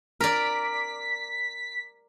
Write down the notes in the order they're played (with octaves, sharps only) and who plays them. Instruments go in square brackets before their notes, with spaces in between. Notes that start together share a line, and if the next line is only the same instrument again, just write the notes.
[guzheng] A#4 D5 [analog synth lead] B6